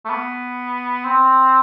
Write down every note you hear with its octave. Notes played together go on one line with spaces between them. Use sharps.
A3
B3
C4